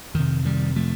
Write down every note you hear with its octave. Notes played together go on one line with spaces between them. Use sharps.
F2 C3 D#3
D#3 G3
F3 A3